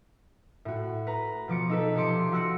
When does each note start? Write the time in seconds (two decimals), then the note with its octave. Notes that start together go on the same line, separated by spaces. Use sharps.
0.65 A2 F#4
1.07 B4 A#5
1.48 B2 F3 D6 C#7
1.70 D#4 A4 B4
1.95 C3 F3 G4 C6 D6 C#7
2.31 F3 F#4 E6 F#6 A#6 C#7